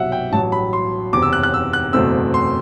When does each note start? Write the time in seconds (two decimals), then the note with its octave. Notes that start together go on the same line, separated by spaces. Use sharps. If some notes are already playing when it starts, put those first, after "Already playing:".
Already playing: C2 B2 F#3 E5 F#5
0.12 G5
0.32 A1 G2 F#3 A5
0.52 B5
0.73 C6
1.13 F#1 E2 C3 D6
1.22 E6
1.33 F#6
1.43 F#6
1.54 E6
1.73 F#6
1.93 F#1 E2 B2 A3 C4 E6
2.34 C6